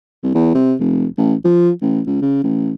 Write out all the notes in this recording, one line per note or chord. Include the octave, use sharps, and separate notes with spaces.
C2
E2
C3
F1
A1
F3
A1
C#2
C#3
A1